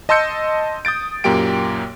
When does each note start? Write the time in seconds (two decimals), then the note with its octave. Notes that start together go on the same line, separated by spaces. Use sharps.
0.09 D#5 A5 C6 E6 G6 C#7
0.85 D#6 G6 A6 D7
1.24 F#2 A#2 A#3 G4 G5 D7